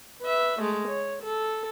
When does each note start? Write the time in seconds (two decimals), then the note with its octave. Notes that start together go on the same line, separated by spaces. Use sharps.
0.22 B4 E5
0.60 G#3 A3
0.88 C#5
1.23 A4